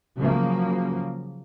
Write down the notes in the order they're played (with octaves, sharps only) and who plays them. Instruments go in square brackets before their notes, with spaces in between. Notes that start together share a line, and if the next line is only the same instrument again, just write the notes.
[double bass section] C#3 F3 F#3 A#3